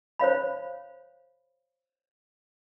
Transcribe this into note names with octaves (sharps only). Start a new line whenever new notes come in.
C5 C#5 F5 B5